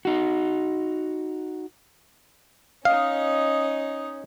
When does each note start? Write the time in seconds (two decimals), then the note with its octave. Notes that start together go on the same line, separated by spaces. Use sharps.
0.05 D#4 F#4
2.85 C#4 D#4 D#5 F5